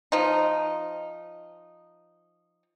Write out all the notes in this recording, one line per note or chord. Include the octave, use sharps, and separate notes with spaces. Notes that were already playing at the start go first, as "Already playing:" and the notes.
F3 D#4